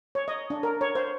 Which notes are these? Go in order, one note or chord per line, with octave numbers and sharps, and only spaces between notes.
C#5
D#5
D4
A#4
C#5
C5